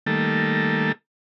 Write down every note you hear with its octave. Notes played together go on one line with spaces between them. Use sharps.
D#3 G3 A3 A#3 A4